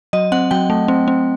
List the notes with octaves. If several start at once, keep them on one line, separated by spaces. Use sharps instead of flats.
F#3 D#5
C4 F#5
F#3 G5
A3
C4
C4